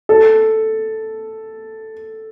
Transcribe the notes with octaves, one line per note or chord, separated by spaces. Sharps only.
A4